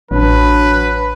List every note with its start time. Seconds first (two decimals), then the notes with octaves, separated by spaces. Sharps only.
0.11 A1 F#3 D4 B4